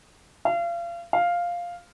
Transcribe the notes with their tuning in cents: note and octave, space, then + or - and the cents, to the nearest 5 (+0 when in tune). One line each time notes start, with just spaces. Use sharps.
F5 -35
F5 +0